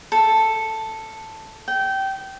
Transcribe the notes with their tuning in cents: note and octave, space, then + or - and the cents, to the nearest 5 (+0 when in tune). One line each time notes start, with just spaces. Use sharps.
A4 +5
G5 -20